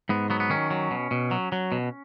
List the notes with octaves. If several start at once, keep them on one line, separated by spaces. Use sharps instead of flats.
G#2 B3
F#3 B3
B3
D#3 C#4
F#3
B2
B2
F#3
F#3
B2